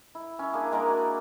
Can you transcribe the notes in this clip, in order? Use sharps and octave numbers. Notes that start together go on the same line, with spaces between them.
E4
C#4 E4
A#3 D4 G#4
G#3 A#3 A#4 D5
F#4